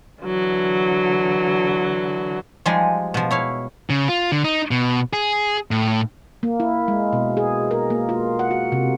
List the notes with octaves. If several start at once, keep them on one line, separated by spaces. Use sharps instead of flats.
D3 E3 F#3
F3 G3 G#3 D#4 G#4
B2 F3
E4 C#5 F5
C#3
F4
D3
D#4
B2
G#4
A2
A#3
E4
G#3
B2
G#4
A#4
A#3
F4
F#5
F#4
C3